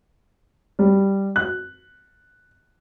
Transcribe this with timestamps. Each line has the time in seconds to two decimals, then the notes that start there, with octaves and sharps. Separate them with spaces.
0.79 G3
1.36 F#6